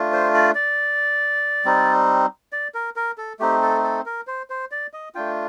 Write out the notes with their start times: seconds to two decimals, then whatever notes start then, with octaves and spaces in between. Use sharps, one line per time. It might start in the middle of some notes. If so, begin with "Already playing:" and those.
Already playing: A3 D4 F4
0.12 C5
0.34 D5
0.55 D5
1.65 G3 C4 D#4
2.53 D5
2.74 A#4
2.96 A#4
3.18 A4
3.39 A3 C4 D#4 G4
3.62 A4
3.84 A4
4.06 A#4
4.27 C5
4.50 C5
4.71 D5
4.93 D#5
5.15 A3 D4 F4 G5